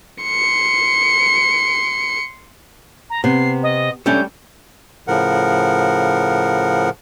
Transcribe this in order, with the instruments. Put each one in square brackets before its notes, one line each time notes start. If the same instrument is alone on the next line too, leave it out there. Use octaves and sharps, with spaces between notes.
[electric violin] C6 C#7
[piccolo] A#5
[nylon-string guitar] C3 [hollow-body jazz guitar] B3 [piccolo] C7
[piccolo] D#5
[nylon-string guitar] G3 [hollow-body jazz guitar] A3 C#4 D4 [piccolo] G6
[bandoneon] A2 C#3 F3 A#4 F#5